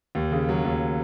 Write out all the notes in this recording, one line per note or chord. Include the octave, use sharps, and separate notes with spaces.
D#2
C#3
F#3
D#2